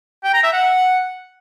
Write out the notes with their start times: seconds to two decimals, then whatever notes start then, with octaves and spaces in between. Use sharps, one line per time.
0.24 G5
0.34 A#5
0.43 E5
0.53 F#5